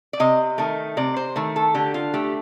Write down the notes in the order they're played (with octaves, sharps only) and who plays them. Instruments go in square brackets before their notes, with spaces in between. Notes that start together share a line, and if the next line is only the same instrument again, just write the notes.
[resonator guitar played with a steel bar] D5
C3 D#5
D#3 A3
C3 D5
C5
D#3 A3
A4
D3 G4
F4
A3 G4